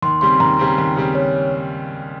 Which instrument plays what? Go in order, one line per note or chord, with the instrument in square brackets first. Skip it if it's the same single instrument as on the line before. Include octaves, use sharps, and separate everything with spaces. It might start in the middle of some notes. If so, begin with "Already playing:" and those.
[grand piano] D#2 [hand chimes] C6
[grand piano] C#3 G3 C4 [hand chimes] C6
[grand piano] D#2 [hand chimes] A#5
[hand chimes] C6
[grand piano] C#3 G3 C4
[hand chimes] A#5
[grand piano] D#2
C#3 G3 C4
[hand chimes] C#5